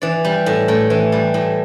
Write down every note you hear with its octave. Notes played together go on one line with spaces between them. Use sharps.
E3 D5
G3
A2
A2
E3
G3
A2